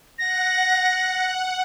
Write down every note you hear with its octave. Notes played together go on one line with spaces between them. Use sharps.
F#5 A#6